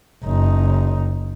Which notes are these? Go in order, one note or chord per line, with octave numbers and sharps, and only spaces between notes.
F#1 D#4